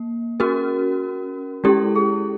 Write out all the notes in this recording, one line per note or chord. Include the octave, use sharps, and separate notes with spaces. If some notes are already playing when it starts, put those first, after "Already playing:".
Already playing: A#3
C#4 F#4 G#4 A#4
G#3 C#4 E4 G4 A4
G#4